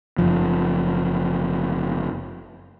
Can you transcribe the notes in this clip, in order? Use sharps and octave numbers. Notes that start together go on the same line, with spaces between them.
F#1 F3